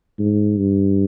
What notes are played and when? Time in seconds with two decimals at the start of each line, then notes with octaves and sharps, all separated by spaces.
0.19 G#2
0.58 G2